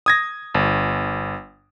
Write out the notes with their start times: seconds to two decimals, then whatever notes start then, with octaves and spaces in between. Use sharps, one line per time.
0.06 D#6 G#6 A#6
0.55 G1